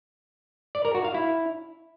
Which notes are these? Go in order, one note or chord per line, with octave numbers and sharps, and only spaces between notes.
D5
A#4
F#4
F5
E4